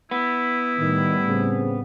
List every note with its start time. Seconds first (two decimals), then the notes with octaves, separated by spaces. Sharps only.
0.11 B3 E4
0.78 A2 D#3 G3
1.27 C#3 C4